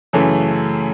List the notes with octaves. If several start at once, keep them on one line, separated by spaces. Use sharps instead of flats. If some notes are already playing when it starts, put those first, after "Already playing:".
F#2 C#3 E3 A3